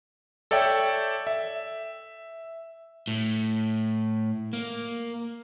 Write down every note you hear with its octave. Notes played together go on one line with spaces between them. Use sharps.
A4 C#5 D5 E5 G5
E5
A2
A#3